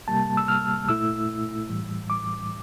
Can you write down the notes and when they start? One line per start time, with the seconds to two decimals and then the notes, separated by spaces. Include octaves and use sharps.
0.08 C3 G3 A#3 A5
0.37 E6
0.48 F6
0.88 A#2 A3 E4 E6
1.69 A2 E3 G3
2.10 D6